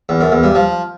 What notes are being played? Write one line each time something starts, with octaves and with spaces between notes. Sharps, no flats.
E2
F#2
E2
G2
F3